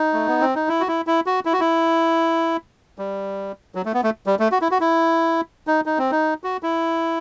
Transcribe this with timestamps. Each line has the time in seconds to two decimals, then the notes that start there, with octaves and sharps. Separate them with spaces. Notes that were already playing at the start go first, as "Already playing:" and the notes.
Already playing: D#4
0.13 A3
0.27 B3
0.41 C4
0.55 D#4
0.69 E4
0.80 F#4
0.88 E4
1.07 E4
1.26 F#4
1.45 E4
1.53 F#4
1.60 E4
2.98 G3
3.75 F#3
3.85 A3
3.94 B3
4.03 A3
4.26 G3
4.39 A3
4.52 F#4
4.61 E4
4.71 F#4
4.81 E4
5.67 D#4
5.86 D#4
5.98 C4
6.12 D#4
6.44 F#4
6.63 E4